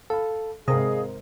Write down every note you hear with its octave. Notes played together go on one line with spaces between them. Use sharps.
A4 F5 B5
G#1 C3 G#4 A#4 C5 D#5 F5